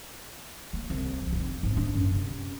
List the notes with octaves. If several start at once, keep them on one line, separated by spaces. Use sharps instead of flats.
A#3
C2
F2
F1
G#1
D4
F#2
C3